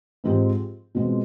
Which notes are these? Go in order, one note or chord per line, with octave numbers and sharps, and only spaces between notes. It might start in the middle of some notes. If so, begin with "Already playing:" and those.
G#2 F3 G#3 C4 G4
B2 G#3 C4 F4